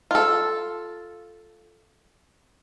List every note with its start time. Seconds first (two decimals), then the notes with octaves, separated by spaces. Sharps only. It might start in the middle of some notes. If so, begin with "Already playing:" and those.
0.11 F4 A4